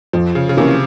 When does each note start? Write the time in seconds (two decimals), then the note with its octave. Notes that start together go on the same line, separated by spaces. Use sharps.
0.13 F2 F3
0.35 C#3
0.49 C#3
0.57 C3 E3 A#3 C#4